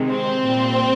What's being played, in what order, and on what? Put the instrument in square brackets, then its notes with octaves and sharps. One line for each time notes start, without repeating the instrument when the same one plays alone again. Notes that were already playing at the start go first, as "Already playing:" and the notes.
Already playing: [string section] C3 D#3 G#3
C4
A#2 G3